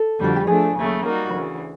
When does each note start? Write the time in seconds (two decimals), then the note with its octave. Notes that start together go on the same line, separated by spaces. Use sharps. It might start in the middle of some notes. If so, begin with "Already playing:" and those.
Already playing: A4
0.19 F2 D3 G3 F#4
0.36 G4
0.47 F3 A3 D4 G#4
0.76 D#2 C#3 F#3 A3
1.05 G3 A#3 D#4 F#4 A#4
1.34 D2 C#3 E3